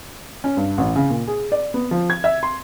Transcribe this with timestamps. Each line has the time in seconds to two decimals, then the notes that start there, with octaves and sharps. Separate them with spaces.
0.44 C#4
0.57 G2
0.78 A1
0.96 C#3
1.10 A#2
1.28 G#4
1.52 D5
1.74 B3
1.91 F3
2.10 G#6
2.24 E5
2.43 C6